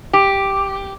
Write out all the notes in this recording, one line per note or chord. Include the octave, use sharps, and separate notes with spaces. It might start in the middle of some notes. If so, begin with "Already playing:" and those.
G4